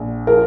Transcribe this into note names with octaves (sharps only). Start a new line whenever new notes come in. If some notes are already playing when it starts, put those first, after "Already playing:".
Already playing: A#1
F3 A#4